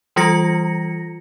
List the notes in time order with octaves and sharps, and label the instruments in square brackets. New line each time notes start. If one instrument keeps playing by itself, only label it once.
[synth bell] E3 G3 F4 A#6 C#7